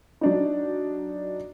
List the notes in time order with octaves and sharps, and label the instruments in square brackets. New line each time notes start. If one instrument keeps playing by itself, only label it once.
[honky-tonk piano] F#3 D4 D#4